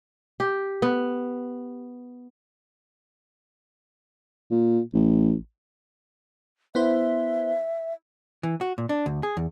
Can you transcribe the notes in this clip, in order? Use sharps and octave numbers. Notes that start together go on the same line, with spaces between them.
G4
B3
A#2
A1
B3 E4 C5 E5
E3
F#4
A#2
D4
D2
G#4
E2